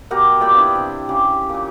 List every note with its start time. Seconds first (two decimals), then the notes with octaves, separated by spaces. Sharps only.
0.11 B2 G4 A#4 F#5
0.41 A#2 D5 G5 B5
0.54 B3 D4 E4
0.76 C3
1.09 C#3 G4
1.49 A#2 A#3